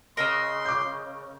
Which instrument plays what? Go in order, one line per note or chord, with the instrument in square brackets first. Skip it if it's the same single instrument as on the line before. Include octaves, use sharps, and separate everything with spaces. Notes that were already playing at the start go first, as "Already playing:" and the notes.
[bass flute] C#3 [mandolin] A#4 D#5 E6 [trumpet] C6
[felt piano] D6 G6